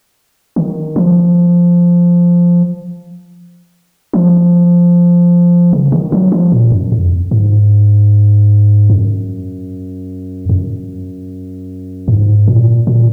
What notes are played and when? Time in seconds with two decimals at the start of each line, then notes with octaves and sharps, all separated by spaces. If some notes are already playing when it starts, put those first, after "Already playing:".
0.56 D#3
0.96 F3
4.13 F3
5.73 C#3
5.92 D#3
6.12 F#3
6.32 F3
6.52 A#2
6.72 F#2
6.92 F2
7.31 G#2
8.90 F#2
10.49 F#2
12.08 G#2
12.48 A#2
12.87 A#2